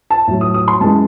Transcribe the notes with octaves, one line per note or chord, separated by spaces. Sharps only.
A5
A2 F#3
D#6
D#6
C6
F#2 E3 G#3 A5